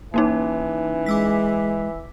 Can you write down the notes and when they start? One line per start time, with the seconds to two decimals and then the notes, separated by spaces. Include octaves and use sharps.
0.14 E3 A#3 C#4 D#4
1.06 G#3 D6 E6 B6